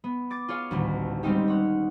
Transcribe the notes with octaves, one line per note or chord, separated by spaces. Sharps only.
B3
D6 A6 D7
F4 G#4 C#5 F5
D#1 A1 D2
G3 G#3 C4 C#4 D#4 G4
C#5 F#5